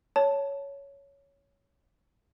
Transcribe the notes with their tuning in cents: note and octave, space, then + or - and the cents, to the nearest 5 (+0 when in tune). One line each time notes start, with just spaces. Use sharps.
C#5 +10 A5 +0